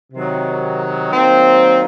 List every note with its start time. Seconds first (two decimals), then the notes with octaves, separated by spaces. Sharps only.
0.13 C3 D#3 F#3
1.11 D#3 F#3 A#3 C4